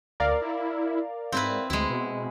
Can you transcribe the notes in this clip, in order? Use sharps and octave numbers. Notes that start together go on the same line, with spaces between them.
D2 A#4 D5 F5
E4
G#2 C4 E4 B4
D2 G#3 E4
B2